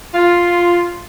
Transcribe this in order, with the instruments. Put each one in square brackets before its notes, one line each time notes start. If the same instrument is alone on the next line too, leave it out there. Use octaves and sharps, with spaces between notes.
[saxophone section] F4